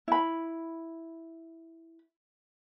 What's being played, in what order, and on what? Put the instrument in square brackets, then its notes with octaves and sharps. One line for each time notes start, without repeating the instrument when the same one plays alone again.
[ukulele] E4 B5